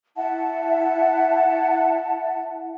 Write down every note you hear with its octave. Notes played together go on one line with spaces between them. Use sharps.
E4 E5 F#5 A5